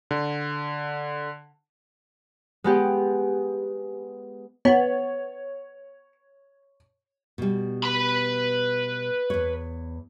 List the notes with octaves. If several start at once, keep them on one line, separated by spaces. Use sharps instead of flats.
D3
G#3 B3 G4
B3 C#5
B2 G3
B4 B5
E2 C#5